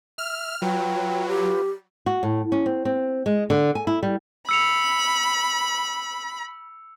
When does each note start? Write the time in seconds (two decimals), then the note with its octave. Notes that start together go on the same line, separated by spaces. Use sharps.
0.18 E5 F6
0.62 F#3 F4 B4 G5
1.29 G4
2.06 F#4
2.23 A2
2.52 C#4
2.66 C4
2.85 C4
3.26 G#3
3.50 D3
3.75 G#5
3.87 E4
4.03 G3
4.49 B5 E6 C#7 F7